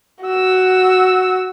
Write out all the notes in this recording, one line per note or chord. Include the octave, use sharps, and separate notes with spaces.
F#4 E6